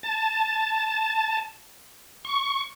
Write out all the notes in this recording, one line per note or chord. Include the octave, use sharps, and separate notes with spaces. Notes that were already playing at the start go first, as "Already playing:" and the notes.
A5
C#6